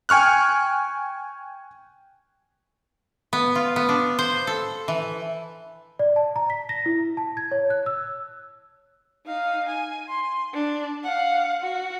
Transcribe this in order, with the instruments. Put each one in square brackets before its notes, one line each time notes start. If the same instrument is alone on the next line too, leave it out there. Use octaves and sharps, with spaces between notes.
[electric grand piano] G5 G#5 C#6 F6 F#6
[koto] B3
F4
B3
D4
C5
A4
E3
[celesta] D5
A5
A#5
B6
A#6
E4
A5
G#6
C#5
F#6
E6
[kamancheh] D#4 F5
G#5
C6
D4
F5 F#5
F#4